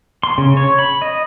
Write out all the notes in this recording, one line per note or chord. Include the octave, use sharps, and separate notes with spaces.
C6
C#3
C#5
B5
D#5